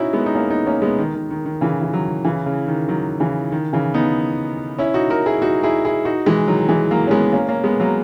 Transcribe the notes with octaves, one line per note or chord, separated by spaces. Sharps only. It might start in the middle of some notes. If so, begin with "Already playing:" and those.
Already playing: C#4 D#4 E4 F#4
G#3 B3
D#4
A#3 C#4
B3 D#4
A#3 C#4
G#3 B3
D#3
D#3
D#3
D#3
C#3 E3
E3
D#3 F#3
C#3 E3
C#3
D#3
D#3 F#3
C#3 E3
D#3
C#3 E3
B3 D#4
C#4 E4
D#4 F#4
F#4 A#4
E4 G#4
D#4 F#4
E4 G#4
E4 G#4
D#4 F#4
E3 G#3
D#3 F#3
E3 G#3
F#3 A#3
C#4
G#3 B3
A#3 C#4
A#3 C#4
G#3 B3
F#3 A#3